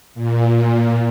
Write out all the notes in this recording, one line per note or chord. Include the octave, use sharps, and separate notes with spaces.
A#2